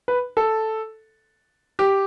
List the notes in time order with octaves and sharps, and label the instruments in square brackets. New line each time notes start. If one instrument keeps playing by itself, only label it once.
[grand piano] B4
A4
G4